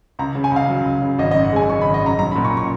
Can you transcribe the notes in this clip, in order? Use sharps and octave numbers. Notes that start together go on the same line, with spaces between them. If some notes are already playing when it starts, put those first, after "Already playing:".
C#2 A#5
C#3
G#5
C#2 F5
F#3
C#2
C#3
G#1 D#5
F#2 D#5
F#5
G#3 G#5
C#3 C#6
G#1 B5
D#5
F#2 A#5
B1 A#5
A#2 B5
C#6
C#6